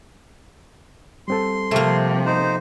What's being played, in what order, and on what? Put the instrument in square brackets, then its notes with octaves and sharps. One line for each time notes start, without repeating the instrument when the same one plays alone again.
[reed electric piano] G3 C4 A4 [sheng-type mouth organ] C6
[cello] C3 F3 [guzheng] A3 A#3
[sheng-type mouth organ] D#4 C5